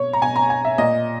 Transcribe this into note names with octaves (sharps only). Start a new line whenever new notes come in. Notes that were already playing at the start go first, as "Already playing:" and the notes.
Already playing: B2 C#5
A#5
B2 G#5
A#5
G#5
E5
A#2 D#5